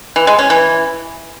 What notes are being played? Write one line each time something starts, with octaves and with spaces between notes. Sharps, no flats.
E3
G#3
C#4
E3